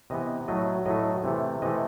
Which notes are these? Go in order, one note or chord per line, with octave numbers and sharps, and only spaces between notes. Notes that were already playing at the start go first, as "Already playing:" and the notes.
C3 E3 B3 D#5
A2 F#3 A3 D#5
A2 F#3 A3 D#5
C3 E3 A3
C3 E3 A3 D#5